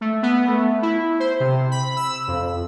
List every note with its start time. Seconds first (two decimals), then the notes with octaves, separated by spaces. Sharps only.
0.01 A3
0.23 B3
0.47 A3
0.82 E4
1.20 C5
1.40 C3
1.71 B5
1.96 E6
2.28 F2